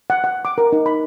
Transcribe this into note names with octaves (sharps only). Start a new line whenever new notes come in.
F#5
F#5
D6
A#4
D#4
B5